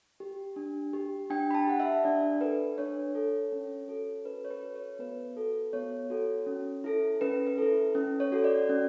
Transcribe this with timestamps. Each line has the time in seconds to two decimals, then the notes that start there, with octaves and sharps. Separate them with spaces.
0.20 G4
0.56 D4
0.93 G4
1.30 D4 G5
1.51 B5
1.55 A5
1.67 G4 F#5
1.80 E5
2.04 D4 D5
2.41 A4 B4
2.78 D4 C#5
3.15 A4
3.52 C#4
3.89 F#4 A4
4.25 C#4 B4
4.45 C#5
4.50 B4
4.63 F#4 A4
4.75 C#5
4.99 B3 B4
5.36 F#4 A4
5.73 B3 C#5
6.10 F#4 A4
6.47 C#4
6.84 E4 A4
7.21 C#4 B4
7.47 B4
7.58 E4 A4
7.95 C#4
8.20 C#5
8.32 F#4 A4
8.44 D5
8.69 C#4